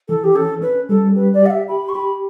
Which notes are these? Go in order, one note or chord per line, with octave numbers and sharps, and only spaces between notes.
E3 A4
G4
C#4 A4
C#4 B4
G3 A4
G4 B4
D5
G4 F#5
E5
G4 B5
C#6
G4 B5